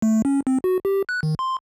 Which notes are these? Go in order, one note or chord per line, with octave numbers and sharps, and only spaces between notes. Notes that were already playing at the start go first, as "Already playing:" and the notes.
A3
C#4
C4
F#4
G4
F#6
D#3
C6